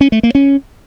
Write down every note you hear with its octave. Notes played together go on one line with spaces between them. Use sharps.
C#4
A3
A#3
C#4